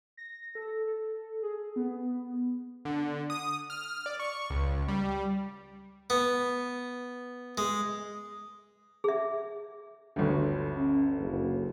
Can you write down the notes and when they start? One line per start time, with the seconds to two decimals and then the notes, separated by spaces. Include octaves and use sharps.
0.17 A#6
0.55 A4
0.87 A4
1.43 G#4
1.76 B3
2.85 D3
3.30 D#6
3.70 F6
4.06 D5
4.20 C#6
4.50 C#2
4.88 G3
6.10 B3
7.58 G#3
9.04 G#4 E5
10.16 G1 D2
10.77 C#4
11.19 F#1